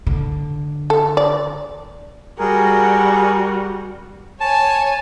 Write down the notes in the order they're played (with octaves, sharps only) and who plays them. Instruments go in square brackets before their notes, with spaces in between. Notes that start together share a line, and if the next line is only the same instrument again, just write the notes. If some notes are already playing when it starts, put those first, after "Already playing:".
[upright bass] D3
[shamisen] A4
D5
[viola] G3 F#4 [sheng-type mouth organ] G#4 A#4
[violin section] C#5 G#5 [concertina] A5